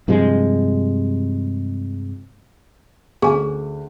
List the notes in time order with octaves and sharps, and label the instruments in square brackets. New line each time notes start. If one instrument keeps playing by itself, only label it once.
[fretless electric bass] G2 C3 F3 G#3
[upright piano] D2 [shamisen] C#4 G#5 [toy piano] G#4